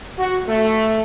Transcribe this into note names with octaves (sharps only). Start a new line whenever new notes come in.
F#4
A3